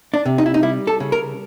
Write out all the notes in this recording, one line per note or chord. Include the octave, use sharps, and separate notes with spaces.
D4
C3
D#4
E4
D#4
G3 E4
A4
C#3
A#4